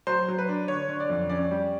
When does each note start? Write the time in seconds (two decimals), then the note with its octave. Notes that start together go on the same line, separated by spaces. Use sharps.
0.07 F#3 C5
0.28 F#3
0.38 B4
0.49 D4
0.68 D3 C#5
0.89 D3
1.00 D5
1.10 F2
1.29 C#4 D5
1.51 G3